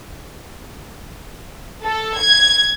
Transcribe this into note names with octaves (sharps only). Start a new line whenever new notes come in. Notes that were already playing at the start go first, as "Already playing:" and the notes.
A4
G#6